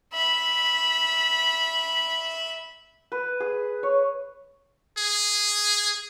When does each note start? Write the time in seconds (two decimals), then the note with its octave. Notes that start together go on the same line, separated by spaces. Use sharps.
0.14 E5 B5
3.12 B4
3.40 G#4
3.83 C#5
4.97 G#4